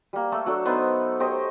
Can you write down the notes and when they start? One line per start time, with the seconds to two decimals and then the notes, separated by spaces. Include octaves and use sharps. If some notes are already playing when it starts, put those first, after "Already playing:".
0.13 G3 A#3
0.32 A3 A4 E6
0.46 F#3 D4 A4
0.65 B3 D#4 B4 C5
1.20 G4 C5 C#5 D#5